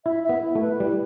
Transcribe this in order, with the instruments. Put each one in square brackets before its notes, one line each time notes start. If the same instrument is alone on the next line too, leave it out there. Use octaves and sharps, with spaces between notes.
[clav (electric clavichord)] E4 [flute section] E5
[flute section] E5
[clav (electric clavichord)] B3
[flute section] E4
[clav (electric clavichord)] A3
[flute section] B4
[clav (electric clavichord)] G3 [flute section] E4